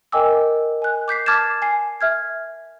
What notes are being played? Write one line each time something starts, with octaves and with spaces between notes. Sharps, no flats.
A#4 D#5 G5 G#5 D6 E6
G#5 F#6
D6 G6 B6 C7
A5 D6 F6 G#6 A6 E7
G#5 C7
E5 F6 G#6